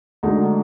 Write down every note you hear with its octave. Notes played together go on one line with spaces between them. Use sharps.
D2 D3 G#3 D#4